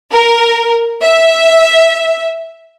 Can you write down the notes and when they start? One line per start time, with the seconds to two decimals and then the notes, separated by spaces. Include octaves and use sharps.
0.12 A#4
1.02 E5